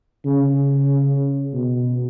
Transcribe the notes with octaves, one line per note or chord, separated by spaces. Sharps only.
C#3
B2